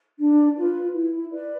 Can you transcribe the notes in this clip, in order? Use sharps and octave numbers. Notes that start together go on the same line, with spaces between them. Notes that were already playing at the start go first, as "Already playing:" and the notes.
D4
F4 B4
E4
B4 D5